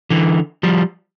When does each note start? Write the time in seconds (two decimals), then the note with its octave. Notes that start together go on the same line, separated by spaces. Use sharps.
0.10 D3 E3
0.63 F3 G3